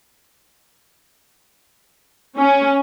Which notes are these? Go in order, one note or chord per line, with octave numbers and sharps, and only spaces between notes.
C#4